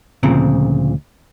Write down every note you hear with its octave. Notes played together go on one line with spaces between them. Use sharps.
D2 A#2 C#3 F3 C4